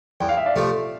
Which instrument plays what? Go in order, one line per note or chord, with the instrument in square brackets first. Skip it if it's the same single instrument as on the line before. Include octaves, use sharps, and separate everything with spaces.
[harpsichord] E2 [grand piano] G5
[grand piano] F5
E5
D5 F5
[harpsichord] C3 F3 A3